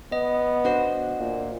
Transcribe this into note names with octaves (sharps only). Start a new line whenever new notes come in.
B3 D#5
D4 F#4 C5
A#2